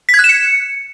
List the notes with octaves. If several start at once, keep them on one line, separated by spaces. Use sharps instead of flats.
B6
G#6
F#6
E7
C#7